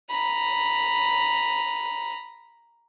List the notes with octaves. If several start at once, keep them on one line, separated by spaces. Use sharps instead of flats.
A#5 B5